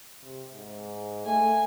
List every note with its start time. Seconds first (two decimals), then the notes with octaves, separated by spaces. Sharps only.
0.24 C3
0.54 G#2
1.26 A3 G#5